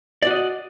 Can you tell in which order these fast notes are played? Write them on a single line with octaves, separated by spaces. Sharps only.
D5 F#4 D#5